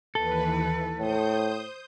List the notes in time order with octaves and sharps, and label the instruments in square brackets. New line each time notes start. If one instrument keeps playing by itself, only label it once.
[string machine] D#2 E3 B4 [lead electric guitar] A4
[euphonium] A2 [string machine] C5 D#6 G6